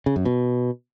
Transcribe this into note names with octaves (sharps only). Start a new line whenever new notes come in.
C#3
F#2
B2